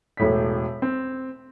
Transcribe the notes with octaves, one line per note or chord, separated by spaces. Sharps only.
E1 A2 B6
C4